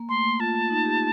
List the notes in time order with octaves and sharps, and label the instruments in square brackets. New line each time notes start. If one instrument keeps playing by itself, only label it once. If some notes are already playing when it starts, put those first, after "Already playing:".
Already playing: [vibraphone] A#3
[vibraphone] A3 [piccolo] C6
[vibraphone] A#3
[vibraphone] F4 [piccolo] A5
[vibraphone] F4
D#4
G4